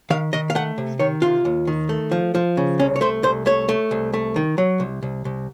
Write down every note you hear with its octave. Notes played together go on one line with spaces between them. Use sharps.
D#3 F5
D#3 D#5
F5
A3 F#5
C3
D#3 C#5
C3 F4
D#2
D#3
A3
F3
F3
C#3
C2 C#4
C#5
A3 C5
C2 C5
A3 C#5
A3
C2
A3
D#3
F#3
C2
C2
C2